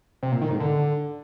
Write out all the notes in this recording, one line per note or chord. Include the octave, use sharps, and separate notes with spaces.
C3
A#2
D#3
G#2
D3